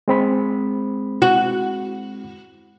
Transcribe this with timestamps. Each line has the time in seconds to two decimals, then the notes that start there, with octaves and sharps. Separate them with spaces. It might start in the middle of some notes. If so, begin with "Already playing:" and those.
0.08 G#3 C4 B5
1.22 F#4